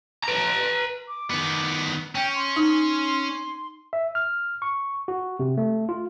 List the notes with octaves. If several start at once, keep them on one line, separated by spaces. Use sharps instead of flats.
B4 A#5
D6
D#3 B3
C#4 G5
C6
D#4
E5
F6
C#6
F#4
C3
A3
F4